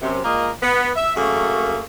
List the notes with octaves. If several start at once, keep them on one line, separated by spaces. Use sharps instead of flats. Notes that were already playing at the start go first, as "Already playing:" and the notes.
F#2 C3
A#2 G#3 A#3 A#4 D#5
B3
E5
F#2 A3 A#3 F#4 G#4